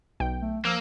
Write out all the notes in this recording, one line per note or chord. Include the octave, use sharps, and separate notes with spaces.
B1 G5
A3
F3 A#3 E6 F6